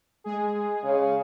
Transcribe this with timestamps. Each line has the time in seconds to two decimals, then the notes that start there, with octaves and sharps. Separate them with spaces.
0.24 G#3 G#4
0.84 C#3